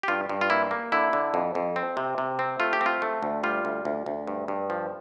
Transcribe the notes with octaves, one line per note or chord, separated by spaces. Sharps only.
G4
G2 F4
G2
F4
A#3 E4
A#3
D3 E4
D3
F2
F2
C4
C3
C3
C4
A3 F4
G4
C4
F4
A3
D2
G3 F4
D2
D2
D2
G2
G2
F3